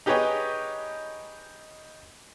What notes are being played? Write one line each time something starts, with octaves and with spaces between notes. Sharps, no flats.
D#4 G4 G#4 B4 C#5 D#5